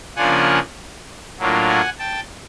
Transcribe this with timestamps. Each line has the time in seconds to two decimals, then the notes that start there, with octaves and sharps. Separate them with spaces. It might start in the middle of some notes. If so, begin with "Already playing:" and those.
0.16 C#3 F3 A#3 D4 F4 F#5 G#5
1.38 A2 F#3 A#3 D4 F4
1.68 F#5 G#5
1.99 G5 A5